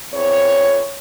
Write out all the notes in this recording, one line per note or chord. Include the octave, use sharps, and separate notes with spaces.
E2 C4 C#5